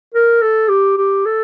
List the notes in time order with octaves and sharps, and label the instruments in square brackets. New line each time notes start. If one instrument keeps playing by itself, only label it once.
[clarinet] A#4
A4
G4
G4
A4